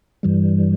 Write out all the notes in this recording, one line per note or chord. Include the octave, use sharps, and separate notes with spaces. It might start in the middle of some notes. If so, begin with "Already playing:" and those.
G2 E3 G3